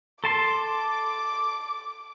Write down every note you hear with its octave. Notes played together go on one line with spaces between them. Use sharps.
A4 A5 C6 D6